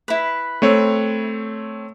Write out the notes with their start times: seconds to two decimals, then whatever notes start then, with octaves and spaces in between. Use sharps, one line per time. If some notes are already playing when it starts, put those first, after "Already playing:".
0.08 E4 B4
0.62 A3 C4 C#5